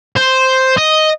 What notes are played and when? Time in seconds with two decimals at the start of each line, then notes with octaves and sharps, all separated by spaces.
0.17 C5
0.78 D#5